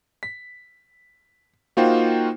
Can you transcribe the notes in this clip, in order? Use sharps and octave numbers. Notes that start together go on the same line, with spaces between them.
B6
A#3 D#4 F4 F#4 C5 G5